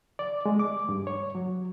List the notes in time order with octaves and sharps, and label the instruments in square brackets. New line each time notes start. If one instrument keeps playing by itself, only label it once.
[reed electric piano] D5
G#3
D6
G2
C#5
F#3